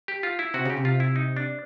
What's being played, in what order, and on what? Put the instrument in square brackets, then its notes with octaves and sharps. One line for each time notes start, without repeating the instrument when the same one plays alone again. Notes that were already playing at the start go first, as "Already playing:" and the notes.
[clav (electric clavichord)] G4
F4
E4
[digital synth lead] C3 [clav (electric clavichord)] F#4
[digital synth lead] C#3 [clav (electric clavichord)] G4
[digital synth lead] C3
[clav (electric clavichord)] F4
E4
D#4
D4